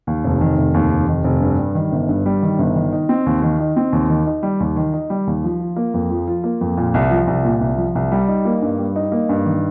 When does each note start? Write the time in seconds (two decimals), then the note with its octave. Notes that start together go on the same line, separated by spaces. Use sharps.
0.07 D#2
0.24 F1
0.41 D#3
0.58 F1
0.74 D#2
0.91 F1
1.08 D#3
1.24 F1
1.42 G2
1.59 G3
1.75 D#3
1.92 G1
2.09 G2
2.26 G3
2.42 D#3
2.59 G1
2.76 D#3
2.92 D#4
3.09 C4
3.26 D#2
3.42 D#3
3.60 D#4
3.76 C4
3.93 D#2
4.10 D#3
4.27 D#4
4.43 G3
4.60 D#2
4.76 D#3
4.93 D#4
5.10 G3
5.27 D#2
5.44 F3
5.60 F4
5.76 A#3
5.94 F2
6.11 F3
6.27 F4
6.44 A#3
6.61 F2
6.77 A#2
6.94 C2
7.11 F3
7.27 C2
7.44 A#2
7.61 C2
7.78 F3
7.95 C2
8.12 G3
8.28 D#4
8.45 A#3
8.62 G2
8.78 G3
8.96 D#4
9.12 A#3
9.29 G2
9.46 D#3